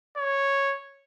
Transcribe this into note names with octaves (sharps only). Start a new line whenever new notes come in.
C#5